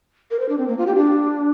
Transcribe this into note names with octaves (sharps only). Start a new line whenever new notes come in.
A#4
C5
D4
C4
A#3
F4
G4
D4